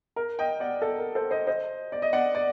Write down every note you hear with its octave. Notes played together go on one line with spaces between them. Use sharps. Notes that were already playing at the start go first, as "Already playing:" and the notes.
A#4
D#5 G5
D5 F#5
A4
A#4
A4 C5
C5 D#5
C5 D#5
D5
D#5
D5 F#5
D5